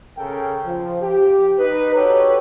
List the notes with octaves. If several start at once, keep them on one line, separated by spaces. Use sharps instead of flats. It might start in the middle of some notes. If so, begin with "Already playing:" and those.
C#3 A4 A#4 G5
F3
G4
D#4 B4
F#4 G4 A4 B4 C#5